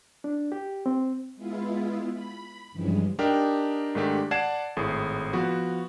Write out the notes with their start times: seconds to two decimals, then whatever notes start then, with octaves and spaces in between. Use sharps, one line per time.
0.24 D4
0.52 G4
0.86 C4
1.36 G#3 B3 E4 F4
2.13 B5
2.72 G2 C#3 E3 F3 G3 G#3
3.19 D4 D#4 G4 A#4 G5 A#5
3.95 G#2 D#3 G#3 A3 D4 G4
4.31 D5 F#5 A5 G#6 C7 E7
4.77 G#1 A2 G#4
5.33 F3 B3 F#4